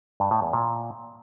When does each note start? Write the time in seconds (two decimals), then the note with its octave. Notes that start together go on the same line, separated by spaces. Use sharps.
0.20 G2
0.31 A2
0.42 E2
0.53 A#2